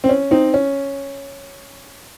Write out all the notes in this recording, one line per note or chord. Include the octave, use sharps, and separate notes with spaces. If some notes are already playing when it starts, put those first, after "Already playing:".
C4
C#4
C4 D#4
C#4